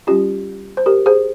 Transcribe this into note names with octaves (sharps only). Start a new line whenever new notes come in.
G3 C#4 F4 G4
C5
G4 A#4
G#4 C5